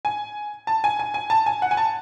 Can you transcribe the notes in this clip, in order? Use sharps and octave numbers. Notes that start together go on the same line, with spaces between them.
G#5
A5
G#5
G#5
G#5
A5
G#5
F#5
G#5
A5